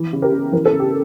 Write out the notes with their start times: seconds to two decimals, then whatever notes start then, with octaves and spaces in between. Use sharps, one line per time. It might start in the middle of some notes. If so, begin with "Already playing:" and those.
Already playing: E3
0.13 C#3
0.22 G4 A#4
0.32 C#3
0.52 E3 A#4
0.65 A4
0.73 C#3
0.80 G4